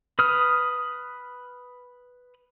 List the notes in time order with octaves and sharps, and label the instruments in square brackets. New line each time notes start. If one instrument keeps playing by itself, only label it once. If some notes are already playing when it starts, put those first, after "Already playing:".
[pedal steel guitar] B4 D#6 F6